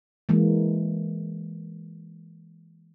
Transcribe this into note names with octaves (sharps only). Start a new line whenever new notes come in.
E3 G#3 A#3